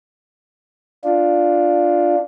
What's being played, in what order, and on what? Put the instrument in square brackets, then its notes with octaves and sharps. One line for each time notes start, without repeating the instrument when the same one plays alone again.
[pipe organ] D4 F4